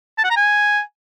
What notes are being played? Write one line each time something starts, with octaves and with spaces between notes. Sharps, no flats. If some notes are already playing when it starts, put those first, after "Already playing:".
A5
F#5
A#5
G#5